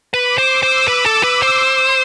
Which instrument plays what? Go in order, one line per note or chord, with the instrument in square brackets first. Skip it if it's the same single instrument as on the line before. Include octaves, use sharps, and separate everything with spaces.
[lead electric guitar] B4 [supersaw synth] D6
[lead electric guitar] C5
[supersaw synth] E6
[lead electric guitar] C5
[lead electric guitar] B4 [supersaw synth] E6
[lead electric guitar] A4
[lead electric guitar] B4 [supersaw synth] D6
[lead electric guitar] C5
[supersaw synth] C6